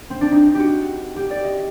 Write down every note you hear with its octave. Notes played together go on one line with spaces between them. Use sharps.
C4
D4
D#4
G4
F#4
G4
D5
D#5